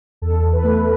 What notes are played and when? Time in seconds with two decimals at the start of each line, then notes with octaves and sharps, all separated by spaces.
0.22 E2 A4
0.42 E2
0.53 B4
0.64 A3